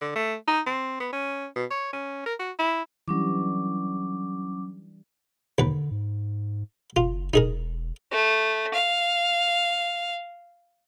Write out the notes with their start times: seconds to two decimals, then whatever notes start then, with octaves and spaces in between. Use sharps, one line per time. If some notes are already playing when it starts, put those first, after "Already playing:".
0.01 D3
0.15 A3
0.48 D#4
0.67 C4
1.00 B3
1.13 C#4
1.56 B2
1.71 C#5
1.93 C#4
2.26 A#4
2.39 F#4
2.59 E4
3.08 E3 F#3 G3 C#4 D4 D6
5.58 D#2 D3 B4
5.91 G#2
6.96 F#1 F4
7.34 E1 D#4 G#4 A#4
8.11 A3
8.74 F5